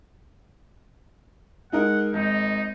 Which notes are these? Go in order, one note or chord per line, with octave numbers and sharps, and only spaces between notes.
G#3 D#4 A#4 F#5
G#1 D#4